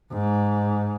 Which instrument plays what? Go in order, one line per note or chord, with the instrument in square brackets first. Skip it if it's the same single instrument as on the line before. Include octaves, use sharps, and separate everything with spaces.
[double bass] G#2